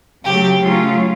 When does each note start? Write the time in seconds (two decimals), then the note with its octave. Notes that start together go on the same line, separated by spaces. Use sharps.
0.24 C#3 F#3 A3 G4
0.60 C#3 F#3 A3 C#4 F4